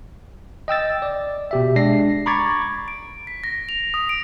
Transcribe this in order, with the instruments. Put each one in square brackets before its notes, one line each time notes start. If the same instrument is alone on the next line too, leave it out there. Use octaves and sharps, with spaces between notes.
[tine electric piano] D#5 G5 E6 A6
D5
B2 G4 E5
G#3 D4 D5 A#6 C7
A#5 B5 C#6 D6 G#6 A6
[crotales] D7
B6
A#6
F7
D#6
D7